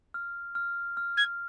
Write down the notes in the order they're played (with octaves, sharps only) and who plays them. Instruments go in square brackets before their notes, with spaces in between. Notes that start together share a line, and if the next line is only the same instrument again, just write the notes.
[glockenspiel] F6
F6
F6
[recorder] G#6